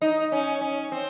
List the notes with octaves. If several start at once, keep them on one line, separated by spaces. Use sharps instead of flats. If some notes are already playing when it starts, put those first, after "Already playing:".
D#4
C#4
C#4
C4